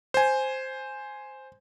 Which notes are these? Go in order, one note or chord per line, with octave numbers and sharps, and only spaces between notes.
C5 G#5